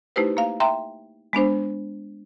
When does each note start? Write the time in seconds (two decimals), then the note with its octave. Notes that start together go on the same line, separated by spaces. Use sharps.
0.16 A3 D#4 E4 G4 B4 C5
0.37 A#3 F5
0.60 E5 G5 A#5 C6
1.33 G#3 B3 D4 C5